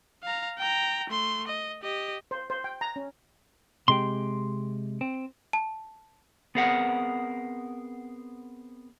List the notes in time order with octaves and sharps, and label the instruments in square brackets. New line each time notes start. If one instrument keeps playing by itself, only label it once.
[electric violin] F5 A#5
G5 A#5
A3 C6
D#5
G4 D#5
[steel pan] C5
C5
G5
A#5
C#4
[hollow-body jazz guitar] C3 G#3 G4 [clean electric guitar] C6
[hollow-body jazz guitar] C4
[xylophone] A5
[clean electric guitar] B3 C4 G#4 A#4 F#5